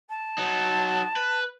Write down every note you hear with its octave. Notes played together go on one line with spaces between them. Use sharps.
A5
F#3 D#4
B4